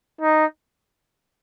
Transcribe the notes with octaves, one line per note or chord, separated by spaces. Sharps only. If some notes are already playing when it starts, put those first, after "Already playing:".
D#4